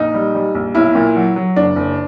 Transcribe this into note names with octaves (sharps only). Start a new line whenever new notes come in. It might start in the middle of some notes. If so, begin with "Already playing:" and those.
Already playing: A#1 D#4
G3
G3
A#1
B1 E4
A#2
F#3
F#3
F#1 D4
F#1